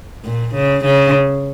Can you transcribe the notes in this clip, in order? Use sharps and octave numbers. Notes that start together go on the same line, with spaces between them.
A#2
C#3
C#3